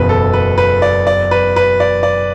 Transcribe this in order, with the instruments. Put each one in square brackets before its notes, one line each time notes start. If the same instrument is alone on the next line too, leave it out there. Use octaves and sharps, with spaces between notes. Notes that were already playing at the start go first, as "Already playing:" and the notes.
Already playing: [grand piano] F#1 E2 B2 [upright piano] B4
[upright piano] A4
B4
B4
D5
D5
B4
B4
D5
D5